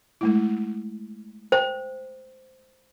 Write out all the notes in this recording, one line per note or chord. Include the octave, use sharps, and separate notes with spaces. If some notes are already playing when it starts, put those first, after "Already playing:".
G#3 A3 E4
C5 G5